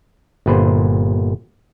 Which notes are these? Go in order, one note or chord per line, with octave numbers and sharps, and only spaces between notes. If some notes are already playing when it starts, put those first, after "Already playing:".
G1 A#2 B4 C5